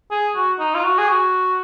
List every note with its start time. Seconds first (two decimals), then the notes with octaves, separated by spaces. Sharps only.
0.11 G#4
0.36 F#4
0.59 D#4
0.75 F4
0.84 F#4
0.98 G#4
1.09 F#4